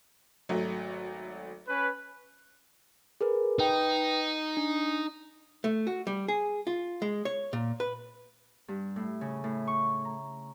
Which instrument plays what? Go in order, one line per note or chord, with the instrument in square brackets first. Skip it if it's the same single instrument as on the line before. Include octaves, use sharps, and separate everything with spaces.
[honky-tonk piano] G#1 F#3 A3
[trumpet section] C#4 B4
[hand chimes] G#4 A#4 B4
[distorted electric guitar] D#4 [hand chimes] B4 G5
[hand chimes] D4
[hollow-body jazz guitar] A3
F#4
G3
G#4
F4
G#3
C#5
A#2
B4
[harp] G2
A2
C#3
A2
C#6
A#5